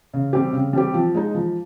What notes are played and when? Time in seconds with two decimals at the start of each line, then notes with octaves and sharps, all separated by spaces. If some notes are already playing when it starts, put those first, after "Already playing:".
0.13 C#3
0.33 G3 C4 G4
0.53 C#3
0.73 G3 C4 G4
0.94 F3
1.15 G#3 D#4
1.34 F3